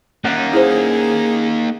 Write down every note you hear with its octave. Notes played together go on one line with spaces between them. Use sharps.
A#3 C#4 D#4 A#4 F#5
E4 G#4 C5